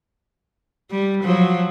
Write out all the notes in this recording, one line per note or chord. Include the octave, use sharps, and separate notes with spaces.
G3
F3 F#3